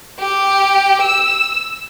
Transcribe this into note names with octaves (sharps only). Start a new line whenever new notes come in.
G4
E6